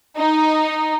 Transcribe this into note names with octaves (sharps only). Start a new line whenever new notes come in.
D#4